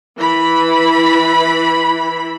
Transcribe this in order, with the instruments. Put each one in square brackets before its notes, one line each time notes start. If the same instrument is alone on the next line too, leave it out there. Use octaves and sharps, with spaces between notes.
[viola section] E3 B5